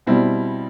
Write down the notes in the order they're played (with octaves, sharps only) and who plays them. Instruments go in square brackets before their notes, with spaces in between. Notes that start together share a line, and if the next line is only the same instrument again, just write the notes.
[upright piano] B2 G3 C4 E4